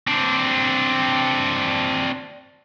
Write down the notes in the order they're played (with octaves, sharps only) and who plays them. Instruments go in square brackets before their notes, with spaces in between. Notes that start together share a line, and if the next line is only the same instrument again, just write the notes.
[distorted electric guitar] C4 D4